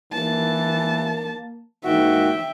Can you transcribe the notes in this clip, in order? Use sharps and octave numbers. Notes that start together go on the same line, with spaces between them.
E3 A#3 A5
G#2 A#3 D#4 F#4 E5 G5